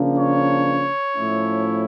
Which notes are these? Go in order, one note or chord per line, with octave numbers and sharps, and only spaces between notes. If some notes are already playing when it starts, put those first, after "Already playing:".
Already playing: C#3 F3 A#3 D4
C#5
A2 F3 A3 C#4 E4